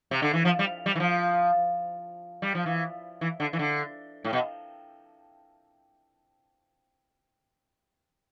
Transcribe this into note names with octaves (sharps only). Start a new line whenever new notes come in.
C3
D3
E3
F3
G3
G3
E3
F3
G3
F3
E3
E3
D3
E3
D3
A2
B2